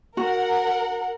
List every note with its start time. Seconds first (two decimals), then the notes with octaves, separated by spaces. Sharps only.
0.17 F#4 A#4 F#5